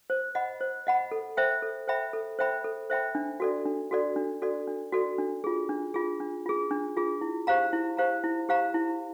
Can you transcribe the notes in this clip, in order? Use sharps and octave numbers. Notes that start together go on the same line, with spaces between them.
C5
D#5 F#5 B5
C5
D#5 F#5 B5
A4
C5 E5 G5 B5
A4
C5 E5 G5 B5
A4
C5 E5 G5 B5
A4
C5 E5 G5 B5
D4
F#4 A4 D5
D4
F#4 A4 D5
D4
F#4 A4 D5
D4
F#4 A4 D5
D4
F4 G#4
D4
F4 G#4
D4
F4 G#4
D4
F4 G#4
E4
G4 C5 F5 A#5
E4
G4 C5 F5 A#5
E4
G4 C5 F5 A#5
E4